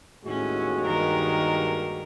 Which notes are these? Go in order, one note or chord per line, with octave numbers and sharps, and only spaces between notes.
D#2 A2 G#3 C#4 F#4
G2 D#3 A#4